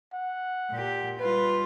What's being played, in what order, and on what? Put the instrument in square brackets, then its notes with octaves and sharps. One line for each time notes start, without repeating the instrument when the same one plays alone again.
[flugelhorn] F#5
[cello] A#2 G4
[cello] G3 F4 [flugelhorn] B4